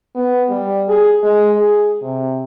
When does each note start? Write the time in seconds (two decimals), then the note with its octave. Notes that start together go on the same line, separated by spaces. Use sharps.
0.15 B3
0.49 G3
0.88 G#4
1.23 G#3
1.58 G#4
2.02 C3